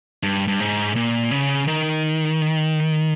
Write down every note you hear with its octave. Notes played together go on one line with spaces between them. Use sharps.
G2
G2
G#2
A#2
C#3
D#3